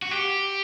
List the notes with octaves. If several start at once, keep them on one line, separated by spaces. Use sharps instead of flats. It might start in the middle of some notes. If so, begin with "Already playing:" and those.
F#4
G4